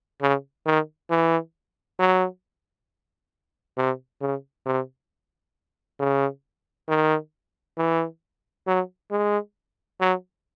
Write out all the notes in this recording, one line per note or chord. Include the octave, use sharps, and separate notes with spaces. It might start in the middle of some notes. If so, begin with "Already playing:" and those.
C#3
D#3
E3
F#3
C3
C#3
C3
C#3
D#3
E3
F#3
G#3
F#3